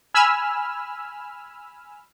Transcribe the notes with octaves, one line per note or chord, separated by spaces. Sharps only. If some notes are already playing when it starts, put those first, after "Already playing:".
G#5 B5 E6 F6